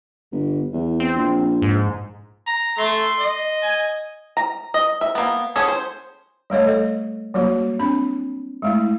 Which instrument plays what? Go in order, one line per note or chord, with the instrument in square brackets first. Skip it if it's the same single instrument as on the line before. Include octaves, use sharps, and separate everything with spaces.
[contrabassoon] G1
E2
[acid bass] C4
[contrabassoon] A#1
[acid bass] G#2
[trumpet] A#5
[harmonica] A3 [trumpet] C6
[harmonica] D#5
[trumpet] G#5
[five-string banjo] A#5
D#5
E5
A#3 B3
B3 C#4 G#4 A4 C#5
C5
[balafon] G3 A3 C#5 D#5
A4 D#5
F#3 G3 A#3 C#4 F#4
C4 D4 B5
G#3 A3 E4